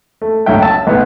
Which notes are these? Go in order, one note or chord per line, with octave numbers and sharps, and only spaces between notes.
A3
C#2 D3 F#3 C#4 E5 G5
E5 A5 E6
B1 B3